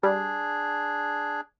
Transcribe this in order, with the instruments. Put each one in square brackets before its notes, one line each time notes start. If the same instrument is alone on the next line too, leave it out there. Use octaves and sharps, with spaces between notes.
[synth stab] G3 [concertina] D4 G#4